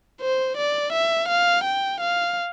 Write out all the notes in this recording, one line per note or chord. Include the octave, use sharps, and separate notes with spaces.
C5
D5
E5
F5
G5
F5